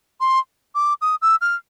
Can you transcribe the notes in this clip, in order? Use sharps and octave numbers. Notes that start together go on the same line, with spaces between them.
C6
D6
D#6
E6
F6